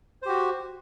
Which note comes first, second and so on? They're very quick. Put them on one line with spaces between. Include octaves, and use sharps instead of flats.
C5 G4 F#4